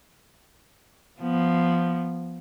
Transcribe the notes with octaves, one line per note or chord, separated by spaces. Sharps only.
F3 B3